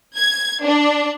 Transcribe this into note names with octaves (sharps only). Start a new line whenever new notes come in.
G#6
D4